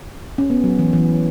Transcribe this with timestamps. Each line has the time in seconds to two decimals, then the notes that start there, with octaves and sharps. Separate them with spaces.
0.38 C#4
0.50 B3
0.64 F#3
0.79 E3
0.93 E3